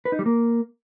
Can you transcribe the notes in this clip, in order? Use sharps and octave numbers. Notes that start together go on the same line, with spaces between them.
B4
D#4
G3
A#3